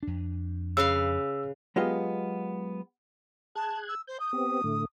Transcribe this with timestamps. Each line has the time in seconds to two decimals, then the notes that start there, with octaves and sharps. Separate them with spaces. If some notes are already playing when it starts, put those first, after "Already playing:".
0.03 F2 D4
0.77 C#3 B4 F5 E6
1.76 F#3 G#3 B3 F4 G4 D#5
3.55 G#4 A5 F#6 G#6
3.88 E6
4.07 C5 G6
4.20 D#6
4.33 B3 C4 G4
4.64 A2 D3 A3